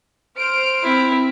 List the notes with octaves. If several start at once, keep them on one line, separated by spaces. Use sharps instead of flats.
C5 F6 D7
C4 E4